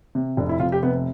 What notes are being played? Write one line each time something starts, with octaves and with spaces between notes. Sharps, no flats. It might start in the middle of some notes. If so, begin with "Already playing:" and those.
C3
F1 D4
E4
F1 F4
G4
C3 B3